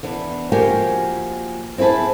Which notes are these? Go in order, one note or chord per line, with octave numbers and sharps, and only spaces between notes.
E3 B3 D4
F3 A#3 F#4 G4 G5 G#5
C4 E4 G#4 B4 A5